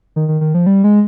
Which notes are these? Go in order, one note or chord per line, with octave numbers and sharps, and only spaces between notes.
D#3
D#3
D#3
F3
G3
G#3